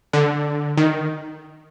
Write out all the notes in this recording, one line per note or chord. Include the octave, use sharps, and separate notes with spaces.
D3
D#3